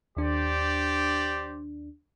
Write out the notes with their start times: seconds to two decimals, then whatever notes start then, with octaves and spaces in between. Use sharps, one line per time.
0.17 D#2 D4 G4 C5 D5